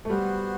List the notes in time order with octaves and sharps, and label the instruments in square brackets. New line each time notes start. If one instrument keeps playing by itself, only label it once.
[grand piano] A3
[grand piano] G3 [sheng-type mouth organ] B3 F#4 C5